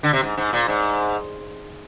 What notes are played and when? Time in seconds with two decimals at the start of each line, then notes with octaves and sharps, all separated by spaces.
0.03 D3
0.13 C3
0.23 G#2
0.38 G#2
0.53 A#2
0.68 G#2